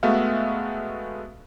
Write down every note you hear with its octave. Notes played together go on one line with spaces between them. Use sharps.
G#3 A3 B3 F#4 E5 F5